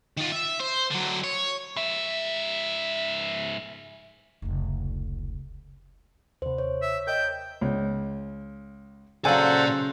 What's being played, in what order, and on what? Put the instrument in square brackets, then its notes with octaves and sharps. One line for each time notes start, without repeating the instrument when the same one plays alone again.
[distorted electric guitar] D#3 F4
E5
C5
D3 F#3
C#5
[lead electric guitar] G#2 E5
[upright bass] F1 C#2
[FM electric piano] D#2 C3 [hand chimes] C5
[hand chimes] C#5
[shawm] E5
[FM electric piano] A#4 D#5 [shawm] G5
[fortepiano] C#2
[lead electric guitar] A#2 D5 [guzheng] C#3 F#3 [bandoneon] A4 C5 F#5 [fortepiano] G#5